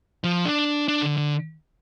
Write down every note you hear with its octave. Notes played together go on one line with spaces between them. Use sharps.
F3
D4
D4
D3
D3